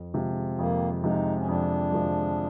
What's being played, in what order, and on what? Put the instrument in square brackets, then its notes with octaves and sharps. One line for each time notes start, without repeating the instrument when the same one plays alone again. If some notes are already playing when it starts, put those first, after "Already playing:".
Already playing: [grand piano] F2
C3 F3 G#3
[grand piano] F2 [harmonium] A#3
[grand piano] C3 F3 G#3 [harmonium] D#4
[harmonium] C#4
[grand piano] F2 [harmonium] D4
[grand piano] C3 F3 G#3